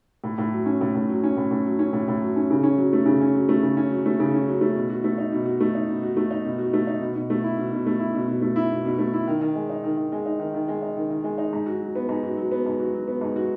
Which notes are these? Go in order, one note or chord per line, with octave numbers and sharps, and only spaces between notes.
A2
A2
F#3
C#4
A2
A2
F#3
C#4
A2
A2
F#3
C#4
A2
A2
F#3
C#4
C#3
C#4
F#3
A3
C#3
C#4
F#3
A3
C#3
C#4
F#3
A3
C#3
C#4
F#3
A3
B2
F#4
A3
D#4
B2
F#4
A3
D#4
B2
F#4
A3
D#4
B2
F#4
A3
D#4
B2
B2
A3
E4
B2
B2
A3
E4
B2
B2
A3
E4
B2
B2
A3
E4
D#3
D#3
G#3
D#4
D#3
D#3
G#3
D#4
D#3
D#3
G#3
D#4
D#3
D#3
G#3
D#4
G#2
F#4
F#3
B3
G#2
F#4
F#3
B3
G#2
F#4
F#3
B3
G#2
F#4